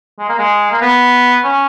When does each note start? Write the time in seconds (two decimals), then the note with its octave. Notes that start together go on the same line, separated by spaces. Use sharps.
0.19 G#3
0.29 A#3
0.39 G#3
0.71 A#3
0.82 B3
1.44 C#4